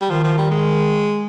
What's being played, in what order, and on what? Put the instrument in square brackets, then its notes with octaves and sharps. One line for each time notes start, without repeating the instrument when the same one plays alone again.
[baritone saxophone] G3
[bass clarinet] D#3 [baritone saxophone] F3
[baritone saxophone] F3
G3
G#3